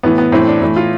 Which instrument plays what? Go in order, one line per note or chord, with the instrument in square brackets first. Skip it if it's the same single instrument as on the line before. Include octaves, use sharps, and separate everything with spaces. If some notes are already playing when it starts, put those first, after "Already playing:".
[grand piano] A2 E3 B3
B3
A2 E3 C4
D4
A2 E3
F4